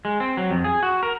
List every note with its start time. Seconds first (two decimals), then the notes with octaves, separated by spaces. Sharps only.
0.05 G#3
0.20 C4
0.37 F#3
0.50 F2
0.64 G#4
0.83 F#4
1.03 A#4